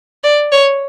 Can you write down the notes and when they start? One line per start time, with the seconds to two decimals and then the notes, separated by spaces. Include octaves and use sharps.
0.24 D5
0.52 C#5